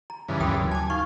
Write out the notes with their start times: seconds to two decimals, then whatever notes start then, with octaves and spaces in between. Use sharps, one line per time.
0.10 A#5
0.29 G2 C#3 E3
0.40 D2 F#3 F#4 A#4 G5
0.71 G#5 A5 D6
0.90 D#4 F5 C#6